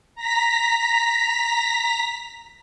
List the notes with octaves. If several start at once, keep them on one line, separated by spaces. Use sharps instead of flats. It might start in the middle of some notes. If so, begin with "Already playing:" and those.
A#5 A#6 B6